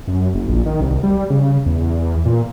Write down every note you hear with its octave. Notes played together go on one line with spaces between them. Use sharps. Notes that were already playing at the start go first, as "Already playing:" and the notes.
F#2
F#1
A#1
D#3
C2
G3
C#3
E2
A#2